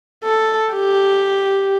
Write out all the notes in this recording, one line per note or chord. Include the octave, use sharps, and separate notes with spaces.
A4
G4